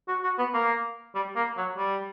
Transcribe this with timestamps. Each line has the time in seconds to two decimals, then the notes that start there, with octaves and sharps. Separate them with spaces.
0.08 F#4
0.23 F#4
0.38 B3
0.54 A#3
1.15 G3
1.36 A#3
1.57 F#3
1.77 G3